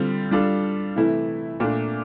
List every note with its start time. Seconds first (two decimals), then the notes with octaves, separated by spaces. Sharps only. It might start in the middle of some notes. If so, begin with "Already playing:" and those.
Already playing: D3 G3 C4 F4
0.31 G3 D4 F4 A4
0.96 C3 E3 A3 E4
1.60 A#2 A3 D4